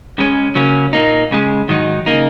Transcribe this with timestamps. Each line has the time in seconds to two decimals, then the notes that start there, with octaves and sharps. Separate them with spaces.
0.18 C#2 C#3 G#3 C#4
0.55 C#3 F#3 A#3 C#4
0.93 A#2 A#3 D#4
1.31 C#2 C#3 G#3
1.68 G#2 D#3 F#3 D#4
2.06 C#3 A#3 D#4